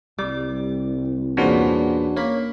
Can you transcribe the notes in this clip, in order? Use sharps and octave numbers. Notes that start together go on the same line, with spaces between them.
C2 G3 D6
E2 A#2 C#4 D4 F#4 C5
A#3 C#5 B5